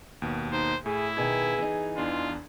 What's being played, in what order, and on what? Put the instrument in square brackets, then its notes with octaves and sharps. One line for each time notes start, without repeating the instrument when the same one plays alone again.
[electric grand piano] D#2 B2
[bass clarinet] D#4 [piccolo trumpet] C5
[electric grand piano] A2 [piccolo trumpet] E4 [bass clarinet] G#4
[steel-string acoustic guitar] B2 D#3 [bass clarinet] G#4 [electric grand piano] G#6
[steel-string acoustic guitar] E3 D#4
[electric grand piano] E2 D4 C6 [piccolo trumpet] F4